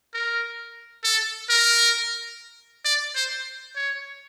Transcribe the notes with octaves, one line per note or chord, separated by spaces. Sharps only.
A#4
A4
A#4
D5
C5
C#5